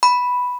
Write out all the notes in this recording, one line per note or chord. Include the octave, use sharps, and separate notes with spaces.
B5